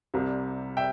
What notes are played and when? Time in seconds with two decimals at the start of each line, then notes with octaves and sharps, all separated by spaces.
0.14 C2 C3 G3
0.77 E5 G5